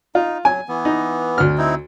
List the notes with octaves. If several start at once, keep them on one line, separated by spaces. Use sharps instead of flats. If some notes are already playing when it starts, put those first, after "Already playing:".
D#4 F4
F#3 G#5
E3 B3
D#4
D2 F6
C4 D#4 E4